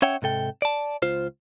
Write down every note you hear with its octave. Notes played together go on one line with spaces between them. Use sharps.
C#4 C#5 E5 F#5 G5
G#2 C3 A4 G5
D5 A5
C#2 F4 C5